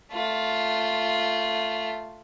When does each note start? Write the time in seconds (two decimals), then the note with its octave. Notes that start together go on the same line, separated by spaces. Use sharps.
0.12 A3 F4